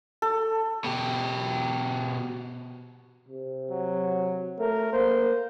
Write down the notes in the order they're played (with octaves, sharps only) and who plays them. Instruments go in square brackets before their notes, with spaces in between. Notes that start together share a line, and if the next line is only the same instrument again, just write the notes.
[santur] A4
[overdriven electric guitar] B2 G4
[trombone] C3
[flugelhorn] F#3
[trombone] A3 [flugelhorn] A#4
[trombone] A#3 [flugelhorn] C5